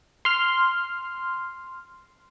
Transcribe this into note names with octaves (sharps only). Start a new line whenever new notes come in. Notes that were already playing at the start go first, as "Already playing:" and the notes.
C6 F6